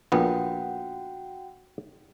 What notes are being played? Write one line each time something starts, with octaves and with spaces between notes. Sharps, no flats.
A#1 A#2 B3 F#4 F#5 G5